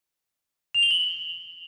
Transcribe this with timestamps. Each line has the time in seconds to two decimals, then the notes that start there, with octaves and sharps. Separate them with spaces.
0.74 F7
0.83 G7
0.91 F#7